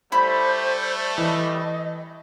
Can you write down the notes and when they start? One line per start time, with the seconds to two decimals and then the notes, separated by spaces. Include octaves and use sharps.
0.12 G3 A3 E4 C5 B5
1.18 E3 D#5